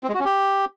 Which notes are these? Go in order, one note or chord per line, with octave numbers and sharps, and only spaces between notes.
C4
G#3
F#4
C#4
G4